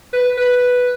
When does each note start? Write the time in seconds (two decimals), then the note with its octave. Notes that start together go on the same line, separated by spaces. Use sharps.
0.13 B4
0.38 B4